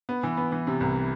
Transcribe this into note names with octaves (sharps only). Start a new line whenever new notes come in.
B3
E3
B3
E3
C3
C2